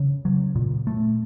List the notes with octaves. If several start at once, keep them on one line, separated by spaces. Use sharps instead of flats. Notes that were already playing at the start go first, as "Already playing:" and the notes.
Already playing: C#3
F#3
A#2
A3